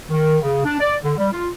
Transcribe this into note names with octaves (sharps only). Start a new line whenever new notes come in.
D#3
C#3
D4
D5
D3
G3
F4